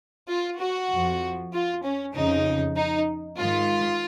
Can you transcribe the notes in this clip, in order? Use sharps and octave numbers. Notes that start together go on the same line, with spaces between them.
F4
F#4
F2 F3
F4
C#4
F2 C#3 F3 D#4
D#4
G#2 D#3 F4